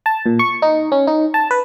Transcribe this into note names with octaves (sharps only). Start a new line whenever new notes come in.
A5
A#2
C#6
D#4
C#4
D#4
A5
B4